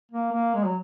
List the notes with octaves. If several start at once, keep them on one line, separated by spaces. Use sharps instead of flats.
A#3
A#3
G#3
F#3